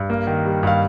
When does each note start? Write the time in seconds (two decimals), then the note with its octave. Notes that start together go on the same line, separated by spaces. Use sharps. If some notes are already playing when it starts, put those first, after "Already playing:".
Already playing: G2
0.10 A#3
0.27 D#3
0.45 G3
0.63 G2 F5